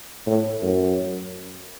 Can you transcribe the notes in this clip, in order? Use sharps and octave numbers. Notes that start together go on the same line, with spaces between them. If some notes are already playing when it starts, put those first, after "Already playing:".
A2
F#2